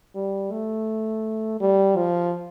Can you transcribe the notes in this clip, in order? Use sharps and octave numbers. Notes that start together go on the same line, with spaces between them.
G3
A3
G3
F3